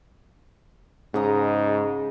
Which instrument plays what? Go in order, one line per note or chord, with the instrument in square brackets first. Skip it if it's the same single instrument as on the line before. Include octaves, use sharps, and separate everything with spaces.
[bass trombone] G#2 [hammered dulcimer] C#3 D#5 A#5